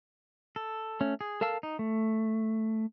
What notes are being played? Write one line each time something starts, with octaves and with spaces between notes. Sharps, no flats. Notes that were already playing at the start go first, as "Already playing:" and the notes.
A4
A3 C#4
G#4
A4 A#4 F5 A5 E6
D#4
A3